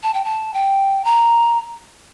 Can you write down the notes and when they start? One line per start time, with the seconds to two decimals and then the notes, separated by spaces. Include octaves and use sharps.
0.03 A5
0.14 G5
0.25 A5
0.54 G5
1.05 A#5